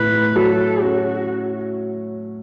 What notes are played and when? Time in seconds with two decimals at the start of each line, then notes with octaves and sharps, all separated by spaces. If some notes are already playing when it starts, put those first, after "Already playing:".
Already playing: A2 B4
0.35 F#3 A4
0.82 C#4 F#4